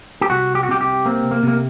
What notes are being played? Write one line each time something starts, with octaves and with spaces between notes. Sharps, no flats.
G4
C2 F#4
G4
F#4
C3 G4
G4
A#3 C4
A#3
C3 A#3